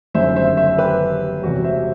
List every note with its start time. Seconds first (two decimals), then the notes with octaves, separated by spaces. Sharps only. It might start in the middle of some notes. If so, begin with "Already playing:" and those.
0.14 G1 F#2 D#3 G3 C5 E5
0.36 C5 E5
0.57 C5 E5
0.78 G4 B4
1.43 E1 E2 C3 F#4
1.64 C5 E5